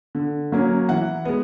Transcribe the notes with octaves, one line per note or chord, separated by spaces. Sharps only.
D3
F#3 A#3 C#4
E3 F#5
G#3 B3